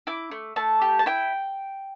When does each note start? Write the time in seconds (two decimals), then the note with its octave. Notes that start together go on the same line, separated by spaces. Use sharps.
0.07 E4 D6
0.31 A3
0.56 A3 A5
0.82 G4
0.99 A5
1.06 E4 G5